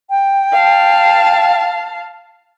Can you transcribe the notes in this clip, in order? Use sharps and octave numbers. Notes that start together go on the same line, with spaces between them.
G5
F5 A5